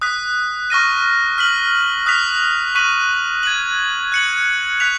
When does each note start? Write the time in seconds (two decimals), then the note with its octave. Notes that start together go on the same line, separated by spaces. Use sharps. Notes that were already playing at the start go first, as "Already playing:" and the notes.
0.02 D#6 F#6 B6
0.70 C#6 F6 A#6 D#7
1.38 F6 B6 F#7
2.06 D#6 F#6 B6 F7
2.75 C#6 F#6 B6 D#7 F#7
3.43 G#6 D#7 F#7
4.12 F#6 C#7 F#7
4.80 F#6 B6 F7